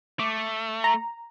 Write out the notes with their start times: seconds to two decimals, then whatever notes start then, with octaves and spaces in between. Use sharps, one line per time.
0.20 A3 D6
0.84 A#5